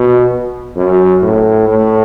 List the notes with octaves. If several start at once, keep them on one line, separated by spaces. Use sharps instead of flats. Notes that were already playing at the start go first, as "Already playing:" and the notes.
Already playing: B2
F#2
A2
A2